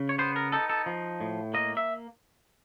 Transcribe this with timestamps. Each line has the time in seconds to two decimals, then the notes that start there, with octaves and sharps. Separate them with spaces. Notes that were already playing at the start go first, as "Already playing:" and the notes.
Already playing: C#3
0.09 C#5
0.18 B3 C5
0.36 A#4
0.52 D#4 A4
0.70 A4
0.86 F3
1.20 A2
1.54 A#3 D#5
1.77 E5